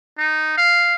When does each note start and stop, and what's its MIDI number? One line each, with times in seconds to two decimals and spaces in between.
0.18 0.54 63
0.57 0.95 77